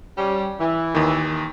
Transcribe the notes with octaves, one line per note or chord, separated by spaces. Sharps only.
G3 C#4
E3
D#2 D#3